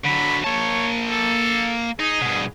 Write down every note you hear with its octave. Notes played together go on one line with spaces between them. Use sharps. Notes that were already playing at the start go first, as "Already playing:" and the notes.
D3 F#3 B5
A#3 C#5 A5
A4
D#4 G#4
G2 B2